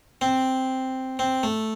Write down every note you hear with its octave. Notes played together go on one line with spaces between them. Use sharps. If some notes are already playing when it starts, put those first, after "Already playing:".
C4
C4
A3